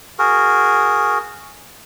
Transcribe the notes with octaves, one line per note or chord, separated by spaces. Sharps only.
F#4 G#4 A#4